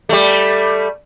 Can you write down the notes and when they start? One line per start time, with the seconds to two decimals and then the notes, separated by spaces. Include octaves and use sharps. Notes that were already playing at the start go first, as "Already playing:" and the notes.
0.09 G3 A3